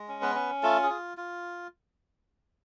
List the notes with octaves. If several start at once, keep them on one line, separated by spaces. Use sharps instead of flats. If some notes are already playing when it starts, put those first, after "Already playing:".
Already playing: G#3
C#4
B3 B4
C#4
A3 F4 A4
G#4
F4
F4